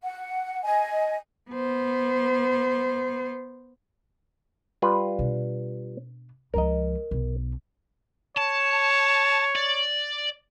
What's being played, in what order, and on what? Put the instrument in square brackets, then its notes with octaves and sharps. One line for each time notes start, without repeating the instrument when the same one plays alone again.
[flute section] F#5
D#5 G#5
[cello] B3 C5
[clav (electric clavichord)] G3 F4 B4
[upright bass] B2 D4
[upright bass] C#2 F3 [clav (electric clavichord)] A#4 D#5
[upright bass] B1
[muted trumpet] C#5 [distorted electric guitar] A5
[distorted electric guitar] D5